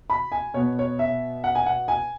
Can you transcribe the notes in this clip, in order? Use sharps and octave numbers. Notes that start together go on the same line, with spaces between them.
B5
G#5
B2 B3 C#5
C#5
E5
F#5
G#5
F#5
G#5